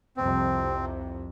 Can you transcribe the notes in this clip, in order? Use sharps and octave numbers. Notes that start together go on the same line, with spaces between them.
C2 F2 C3 C4